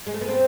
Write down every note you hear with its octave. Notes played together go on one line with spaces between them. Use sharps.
G#3
A3
B3
C4